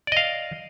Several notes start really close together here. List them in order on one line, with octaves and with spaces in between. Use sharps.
D5 D#5 F5